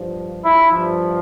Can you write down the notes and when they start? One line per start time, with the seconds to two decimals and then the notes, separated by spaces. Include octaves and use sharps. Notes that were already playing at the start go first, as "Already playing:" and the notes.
Already playing: G2 F3
0.43 E4
0.71 G2 F3